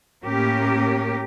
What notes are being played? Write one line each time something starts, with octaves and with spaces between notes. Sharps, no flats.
A2 A#3 C#4 G4 A#4